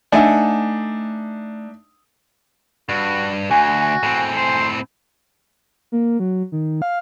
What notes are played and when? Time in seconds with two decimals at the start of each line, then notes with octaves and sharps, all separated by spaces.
0.12 A3 D4 D#4 E5 F#5 G#5
2.89 G2 F#4
3.51 D2 F#4 G#5
4.03 A2 C4
4.37 C5
5.92 A#3
6.20 F#3
6.52 D#3
6.82 F5